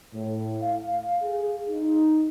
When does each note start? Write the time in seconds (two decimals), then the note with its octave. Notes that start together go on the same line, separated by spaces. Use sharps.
0.13 A2
0.62 F5
1.22 G#4
1.69 D#4